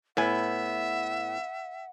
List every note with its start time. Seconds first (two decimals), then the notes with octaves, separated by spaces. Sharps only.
0.17 A2 B3 E5 F#5 G#5